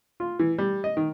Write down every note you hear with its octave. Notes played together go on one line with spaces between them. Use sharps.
F4
E3
G3
D#5
D#3